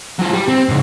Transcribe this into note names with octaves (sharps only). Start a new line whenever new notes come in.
F#3 F4
G3
C4
G#2 C#3